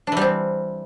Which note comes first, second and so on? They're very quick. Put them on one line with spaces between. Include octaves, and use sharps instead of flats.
D4 E3 G3 C4